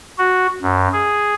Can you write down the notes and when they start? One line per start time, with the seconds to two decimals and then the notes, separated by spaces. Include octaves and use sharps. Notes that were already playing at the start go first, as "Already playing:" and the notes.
0.19 F#4
0.62 F#2
0.92 G#4